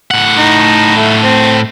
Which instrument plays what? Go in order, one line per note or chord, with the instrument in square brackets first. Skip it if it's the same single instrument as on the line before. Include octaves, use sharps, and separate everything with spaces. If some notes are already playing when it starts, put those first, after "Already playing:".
[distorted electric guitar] A2 F#5
[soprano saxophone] D#4
A3
C4